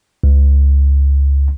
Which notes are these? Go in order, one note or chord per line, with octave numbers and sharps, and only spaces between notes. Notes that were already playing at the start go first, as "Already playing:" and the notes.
C#2